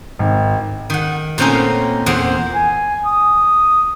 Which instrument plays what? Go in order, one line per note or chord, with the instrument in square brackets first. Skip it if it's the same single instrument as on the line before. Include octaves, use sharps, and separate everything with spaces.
[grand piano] G#1
[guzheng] D#3 F#5
A#2 A3 C4 C#4 D#4 A#4
E2 A#2 C5 F#5
[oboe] G#5
D#6